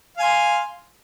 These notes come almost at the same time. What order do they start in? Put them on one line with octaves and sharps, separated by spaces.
F5 G#5 C6